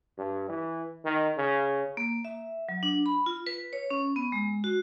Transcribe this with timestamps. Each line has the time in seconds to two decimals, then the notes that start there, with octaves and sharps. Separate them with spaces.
0.18 G2
0.49 E3
1.05 D#3
1.37 C#3
1.97 A#3
2.25 E5
2.69 F#3
2.83 D4
3.06 B5
3.26 F4
3.47 B4
3.73 C#5
3.90 C#4
4.16 B3
4.32 G#3
4.64 F#4